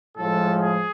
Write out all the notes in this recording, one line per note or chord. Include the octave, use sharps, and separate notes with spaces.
A2 F3 G#3 A4
G#4